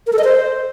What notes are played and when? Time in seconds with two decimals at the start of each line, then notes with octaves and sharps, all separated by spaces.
0.07 A#4
0.13 A4
0.18 D#5
0.24 C5